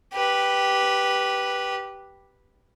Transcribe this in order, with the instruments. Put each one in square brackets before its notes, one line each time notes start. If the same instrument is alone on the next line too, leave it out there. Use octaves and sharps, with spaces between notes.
[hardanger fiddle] G4 B4